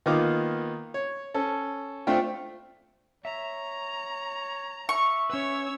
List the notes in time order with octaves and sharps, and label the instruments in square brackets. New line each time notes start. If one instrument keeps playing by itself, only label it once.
[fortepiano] D#3 A#3 B3 D#4 F4 D6
C#5
C#4 A4
A3 C4 D4 F4 G5
[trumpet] C#5 [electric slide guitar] E5 [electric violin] A#5
[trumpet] E5 [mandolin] C#6
[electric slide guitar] C#4 B4 [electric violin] C#5 E6